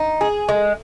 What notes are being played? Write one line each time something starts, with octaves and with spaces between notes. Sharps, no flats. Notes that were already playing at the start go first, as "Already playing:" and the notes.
Already playing: D#4
G#4
G#3